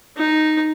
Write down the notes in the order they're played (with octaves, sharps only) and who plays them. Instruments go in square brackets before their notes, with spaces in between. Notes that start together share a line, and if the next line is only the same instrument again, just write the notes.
[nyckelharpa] D#4